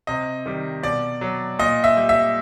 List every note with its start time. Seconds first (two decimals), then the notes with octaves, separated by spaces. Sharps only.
0.07 C3 D#5
0.46 D#3 G3
0.83 B2 D5
1.21 F#3
1.59 A#2 D#5
1.84 E5
1.97 G3
2.09 E5